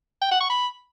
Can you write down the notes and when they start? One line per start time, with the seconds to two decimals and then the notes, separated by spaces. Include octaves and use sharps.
0.22 G5
0.31 F#5
0.41 C#6
0.50 B5